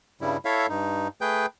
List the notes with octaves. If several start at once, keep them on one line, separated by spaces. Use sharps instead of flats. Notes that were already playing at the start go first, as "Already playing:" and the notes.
G2 C#3 G3 E4
E4 A4 C#5 E5 F5
G2 D#4
A3 G#4 B4 G5 G6